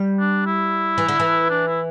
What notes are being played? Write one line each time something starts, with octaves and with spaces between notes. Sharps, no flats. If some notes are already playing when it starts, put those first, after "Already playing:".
Already playing: G3
D4
E4
E3
D3
E3
D4
E4